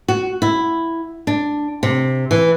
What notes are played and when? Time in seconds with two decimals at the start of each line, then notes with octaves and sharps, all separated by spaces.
0.08 F#4
0.42 E4
1.27 D4
1.83 C3
2.31 E3